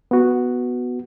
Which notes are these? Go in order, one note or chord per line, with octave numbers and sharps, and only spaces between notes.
B3 F#4